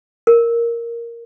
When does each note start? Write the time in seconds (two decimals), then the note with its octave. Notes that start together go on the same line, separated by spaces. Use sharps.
0.27 A#4